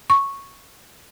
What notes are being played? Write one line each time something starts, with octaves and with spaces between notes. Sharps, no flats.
C#6